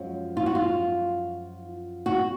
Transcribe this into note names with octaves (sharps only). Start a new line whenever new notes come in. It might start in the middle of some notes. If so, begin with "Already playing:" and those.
Already playing: F#2 F3 G#3
F4
F#4
F4
F#4